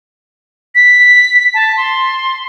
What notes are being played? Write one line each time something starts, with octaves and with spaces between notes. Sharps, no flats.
B6
A5
C6